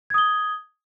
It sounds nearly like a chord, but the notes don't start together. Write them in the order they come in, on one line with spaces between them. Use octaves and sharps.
G#6 D#6 G7